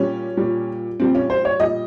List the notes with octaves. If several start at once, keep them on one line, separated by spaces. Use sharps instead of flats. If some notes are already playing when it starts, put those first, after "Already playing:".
Already playing: A#2 G3 C#4
A#2 G3
A#2 G3 C4
C#4
C5
C#5
A#2 G3 D#5